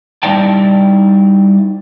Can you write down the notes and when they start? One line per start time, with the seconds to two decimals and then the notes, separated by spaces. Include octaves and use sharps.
0.23 G3 D#4 E4 D5 G5 A5